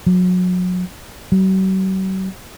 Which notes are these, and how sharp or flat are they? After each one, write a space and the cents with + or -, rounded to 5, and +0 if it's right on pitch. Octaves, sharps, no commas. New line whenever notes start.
F#3 -30
F#3 +45